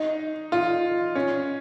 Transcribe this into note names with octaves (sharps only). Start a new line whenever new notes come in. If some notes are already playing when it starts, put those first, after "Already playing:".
Already playing: D#4
F4
C#4